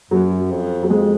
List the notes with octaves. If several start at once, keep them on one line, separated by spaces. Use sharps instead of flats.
F#2 F#3
F2
F#3
F2 G#3